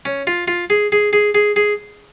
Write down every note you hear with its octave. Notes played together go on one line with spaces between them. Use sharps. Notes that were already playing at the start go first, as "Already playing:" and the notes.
C#4
F4
F4
G#4
G#4
G#4
G#4
G#4